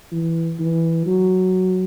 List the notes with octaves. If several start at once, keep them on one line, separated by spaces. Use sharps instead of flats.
E3
E3
F#3